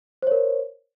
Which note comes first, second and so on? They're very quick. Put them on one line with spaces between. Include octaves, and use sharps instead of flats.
C5 C#5 A#4